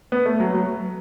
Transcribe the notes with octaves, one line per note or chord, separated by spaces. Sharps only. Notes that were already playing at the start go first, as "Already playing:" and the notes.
B3
A3
F#3
F#3